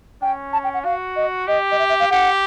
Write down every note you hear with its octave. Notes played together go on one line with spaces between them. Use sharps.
C#4 G5
A5
G5
F#5
F#4 F5
D#5
G4 D#5
D#5
E5
E5
F5
G4 F#5